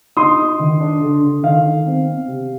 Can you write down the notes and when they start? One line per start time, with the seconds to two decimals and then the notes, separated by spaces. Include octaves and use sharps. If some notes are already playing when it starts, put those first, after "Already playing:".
0.17 D#4 C6 D#6
0.38 D#4
0.59 D#3
0.80 D4
1.01 D3
1.23 D3
1.43 D#3 F5
1.65 D#3
1.86 C4
2.07 C4
2.27 C3